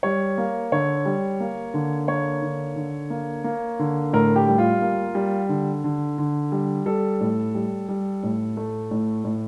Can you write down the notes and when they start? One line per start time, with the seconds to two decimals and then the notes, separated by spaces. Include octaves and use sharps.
0.03 G3 C#5
0.38 A#3
0.72 D3 C#5
1.06 G3
1.40 A#3
1.74 D3
2.08 A#3 C#5
2.42 D3
2.76 D3
3.10 A#3
3.44 A#3
3.79 D3
4.13 A2 A#4
4.36 G4
4.48 G3
4.58 F4
4.82 A#3
5.15 G3
5.49 D3
5.84 D3
6.18 D3
6.52 G3
6.86 G3 A4
7.21 A2
7.55 G3
7.89 G3
8.23 A2
8.57 A3
8.91 A2
9.24 A2